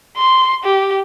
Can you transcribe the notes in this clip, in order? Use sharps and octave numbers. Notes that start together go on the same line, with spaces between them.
C6
G4